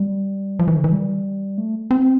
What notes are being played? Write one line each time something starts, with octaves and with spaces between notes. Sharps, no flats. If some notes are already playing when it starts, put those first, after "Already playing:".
Already playing: G3
F3
E3
D3
E3
G3
A3
C4